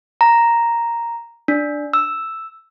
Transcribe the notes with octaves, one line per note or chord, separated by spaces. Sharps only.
A#5
D4
E6